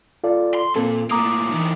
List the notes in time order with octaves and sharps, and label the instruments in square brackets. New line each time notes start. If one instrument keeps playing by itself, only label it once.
[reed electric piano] F4 A4 D5
[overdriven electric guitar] C6
[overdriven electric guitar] A#2 [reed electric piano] A#3 C4 A4
[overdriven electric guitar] A2 A#3 [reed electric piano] A#5 D6 D#6
[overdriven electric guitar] E3 D#4